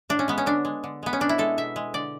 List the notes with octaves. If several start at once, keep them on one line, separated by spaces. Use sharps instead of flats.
A2 D4
C#4
G#3 B3
C#4
D3 D4
G#3
D3
G#3 B3
C#4
B2 D4
E4
G#3 A4
B2 E5
G#3
D3 D5